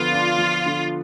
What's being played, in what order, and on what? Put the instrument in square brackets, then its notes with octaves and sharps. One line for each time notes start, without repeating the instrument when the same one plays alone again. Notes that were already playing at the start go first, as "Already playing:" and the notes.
Already playing: [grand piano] D3 F3 B3 [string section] F4
[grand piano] D4
F3
D3